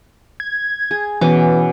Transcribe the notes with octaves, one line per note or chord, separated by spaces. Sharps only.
G#6
G#4
B2 E3 C#4 D6